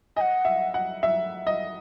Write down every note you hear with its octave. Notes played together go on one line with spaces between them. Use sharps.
D#5 F#5 G#5
E5
F#5
E5
D#5